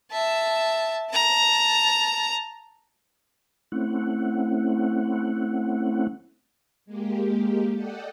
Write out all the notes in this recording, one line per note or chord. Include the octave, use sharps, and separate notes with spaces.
E5 A5
A5 A#5
A3 C4 C#4 E4 F#5
G#3 A#3 G4
A4 D5 D#5 F#5 G5